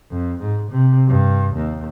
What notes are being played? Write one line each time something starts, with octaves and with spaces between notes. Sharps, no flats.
F2
G#2
C3
G2
D#2